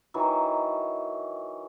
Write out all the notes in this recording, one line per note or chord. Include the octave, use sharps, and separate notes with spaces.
D#3 E3 F#3